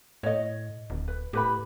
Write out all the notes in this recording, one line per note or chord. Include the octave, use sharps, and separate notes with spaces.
A2 C#5 D#5
D1
B4
A2 G4 B4 B5